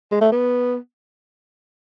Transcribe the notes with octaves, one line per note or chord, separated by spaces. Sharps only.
G#3
A3
B3